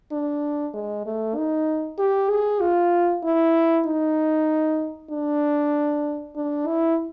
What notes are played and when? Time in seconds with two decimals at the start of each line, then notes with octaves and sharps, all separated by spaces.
0.12 D4
0.74 G#3
1.06 A3
1.36 D#4
1.98 G4
2.30 G#4
2.61 F4
3.24 E4
3.86 D#4
5.10 D4
6.36 D4
6.67 E4